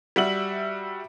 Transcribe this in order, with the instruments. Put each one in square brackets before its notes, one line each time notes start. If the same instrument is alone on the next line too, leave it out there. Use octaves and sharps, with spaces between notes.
[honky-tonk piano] G3 F#4 E5 F#7